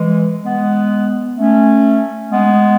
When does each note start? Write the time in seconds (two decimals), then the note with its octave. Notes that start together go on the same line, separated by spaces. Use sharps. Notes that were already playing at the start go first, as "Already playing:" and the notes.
Already playing: E3 G#3
0.44 G#3 B3
1.37 A3 C#4
2.31 G#3 B3